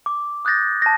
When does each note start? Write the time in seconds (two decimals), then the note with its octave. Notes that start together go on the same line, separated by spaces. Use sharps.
0.06 D6
0.45 D#6 F#6 G6 A6 A#6
0.82 A5 A#6